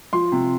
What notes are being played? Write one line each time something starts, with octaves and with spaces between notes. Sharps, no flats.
F3 C6
C3